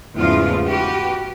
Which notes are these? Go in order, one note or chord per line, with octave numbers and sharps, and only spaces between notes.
E2 G#2 C#3 F3 A3 F4
F#4 G4 B4